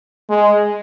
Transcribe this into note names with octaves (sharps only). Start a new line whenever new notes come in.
G#3